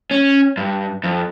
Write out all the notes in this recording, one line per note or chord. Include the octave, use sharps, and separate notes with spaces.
C#4
G2
F2